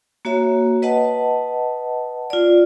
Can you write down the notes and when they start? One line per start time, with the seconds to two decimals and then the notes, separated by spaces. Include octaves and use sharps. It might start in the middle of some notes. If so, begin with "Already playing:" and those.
0.25 A#3 F#4 C#5 E5
0.82 B4 D#5 F#5 A5
2.30 F4 D5